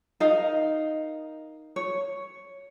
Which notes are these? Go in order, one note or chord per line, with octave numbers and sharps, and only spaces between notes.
D#4 A#4 D#5 F5
C#5